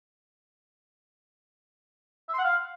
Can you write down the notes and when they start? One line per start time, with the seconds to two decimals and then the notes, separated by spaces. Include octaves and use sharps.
2.29 E5
2.34 C6
2.39 F#5
2.44 F5